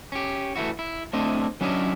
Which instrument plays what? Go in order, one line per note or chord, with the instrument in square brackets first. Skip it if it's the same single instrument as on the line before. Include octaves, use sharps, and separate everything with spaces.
[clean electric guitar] C#4 G4
E3 A3 E4 F#4
E4
A3 C4 D4 E4 D#5
F#3 C#4 D4 E4 C#5 D#5